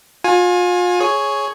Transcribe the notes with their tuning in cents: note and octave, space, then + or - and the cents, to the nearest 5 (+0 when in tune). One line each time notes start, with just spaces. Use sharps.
F4 +35 G#5 +0
G#4 +10 C#5 +0